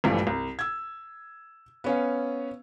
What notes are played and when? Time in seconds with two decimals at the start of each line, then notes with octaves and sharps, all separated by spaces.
0.04 A#1 G2 E3 G3 A3
0.27 C2
0.59 E6 G#6
1.84 B3 C#4 F5